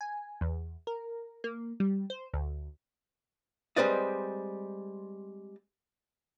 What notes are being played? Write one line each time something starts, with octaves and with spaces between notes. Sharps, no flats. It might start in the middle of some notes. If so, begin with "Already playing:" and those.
G#5
E2
A#4
A#3
G3
C5
D2
G3 G#3 C4 B4 D5 D#5